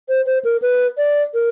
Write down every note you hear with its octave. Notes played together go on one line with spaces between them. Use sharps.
C5
C5
A#4
B4
D5
A#4